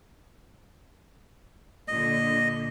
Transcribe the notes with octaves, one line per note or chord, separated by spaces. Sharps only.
A#2 D3 D#5